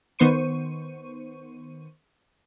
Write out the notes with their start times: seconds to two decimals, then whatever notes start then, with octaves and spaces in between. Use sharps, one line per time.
0.19 D#3 B3 C5 C#6 D#7